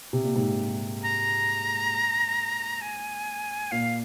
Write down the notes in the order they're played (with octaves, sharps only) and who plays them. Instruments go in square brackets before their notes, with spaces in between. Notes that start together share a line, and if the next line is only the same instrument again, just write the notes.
[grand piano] C3
A#2
G#2 C3
[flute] A#5
G#5
[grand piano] A#2 [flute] F5